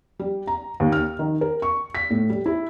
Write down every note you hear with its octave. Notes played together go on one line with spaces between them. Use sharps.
G3
A#5
D#2
F6
D#3
A#4
C#6
B6
A2
G3
E4